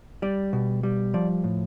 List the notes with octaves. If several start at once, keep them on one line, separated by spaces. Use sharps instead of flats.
G3 D5
B2
G3
F3 D5
A2